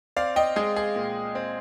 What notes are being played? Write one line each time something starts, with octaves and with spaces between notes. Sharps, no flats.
C4 D5 F5
D#5 G5
G#3 G#4
G#4
A#2
C4